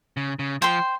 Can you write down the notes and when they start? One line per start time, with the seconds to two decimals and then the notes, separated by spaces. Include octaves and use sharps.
0.17 C#3
0.39 C#3
0.62 F3 C5 G5 C6